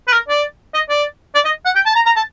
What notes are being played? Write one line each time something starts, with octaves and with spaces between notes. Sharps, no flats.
B4
A#4
D5
D#5
D5
D5
D#5
F#5
G5
A5
A#5
A#5
A5